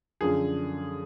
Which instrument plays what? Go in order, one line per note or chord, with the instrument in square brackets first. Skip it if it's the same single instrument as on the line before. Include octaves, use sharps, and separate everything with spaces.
[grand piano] F#2 D3 F3 G#4